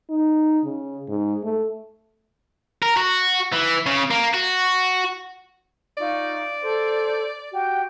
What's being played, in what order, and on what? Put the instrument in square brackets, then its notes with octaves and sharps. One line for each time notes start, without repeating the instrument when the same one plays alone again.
[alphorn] D#4
C#3
G#2
A3
[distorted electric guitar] A#4
F#4
E3
C#3
A#3
F#4
[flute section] D#4 F4 C#6 [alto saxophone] D5
[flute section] A4 C5
F#4 G4 G5